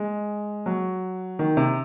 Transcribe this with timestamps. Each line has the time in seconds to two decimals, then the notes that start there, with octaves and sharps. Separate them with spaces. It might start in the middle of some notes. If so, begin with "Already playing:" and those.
Already playing: G#3
0.66 F#3
1.39 D#3
1.57 C3